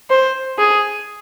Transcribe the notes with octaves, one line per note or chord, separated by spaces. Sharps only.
C5
G#4